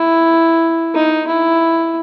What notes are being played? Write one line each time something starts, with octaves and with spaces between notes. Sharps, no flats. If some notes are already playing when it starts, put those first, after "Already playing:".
Already playing: E4
D#4
E4